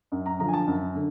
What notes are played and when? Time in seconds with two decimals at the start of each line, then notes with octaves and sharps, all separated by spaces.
0.12 F#2
0.26 A#5
0.39 D3 F3 A#5
0.48 G#5
0.54 A5
0.67 F#2
0.95 D3